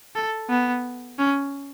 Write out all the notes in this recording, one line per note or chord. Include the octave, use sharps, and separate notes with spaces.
A4
B3
C#4